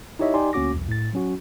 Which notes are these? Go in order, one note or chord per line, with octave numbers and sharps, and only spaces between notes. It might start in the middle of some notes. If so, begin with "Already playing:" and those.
D#4 E4 G4 C#5 D#5 E5
D#4 G4 D5 G#5 C6
D2 A#3 C#4 F#4 D6 A#6
B1 E2
A2 A6
F#3 C#4 F#4